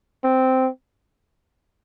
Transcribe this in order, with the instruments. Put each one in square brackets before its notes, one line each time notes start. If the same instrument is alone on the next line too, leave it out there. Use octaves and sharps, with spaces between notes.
[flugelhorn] C4